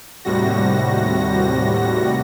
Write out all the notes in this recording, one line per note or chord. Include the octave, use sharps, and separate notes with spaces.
D#2 A2 C3 G3 F#4 A#6